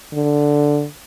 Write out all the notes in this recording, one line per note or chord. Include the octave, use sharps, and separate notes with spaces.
D3